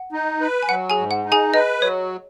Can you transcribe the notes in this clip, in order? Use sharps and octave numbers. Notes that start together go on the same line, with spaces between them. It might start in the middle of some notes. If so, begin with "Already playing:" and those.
Already playing: F#5
D#4
B4
G#5
F#3 F#5
G#4 G#5
G#2
F#5
D#4
G#4 G#5
B4 D#5
F#3 C#5